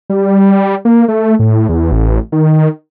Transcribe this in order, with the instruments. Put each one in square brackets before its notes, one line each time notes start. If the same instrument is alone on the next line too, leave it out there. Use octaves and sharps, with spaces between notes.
[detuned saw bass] G3
A#3
A3
A2
E2
A1
D#3